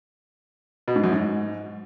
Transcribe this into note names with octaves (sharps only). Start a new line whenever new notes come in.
B2
G#2
F#2
G#2